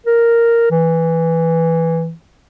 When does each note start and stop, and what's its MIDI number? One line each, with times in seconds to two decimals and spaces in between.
0.06 0.69 70
0.71 2.11 52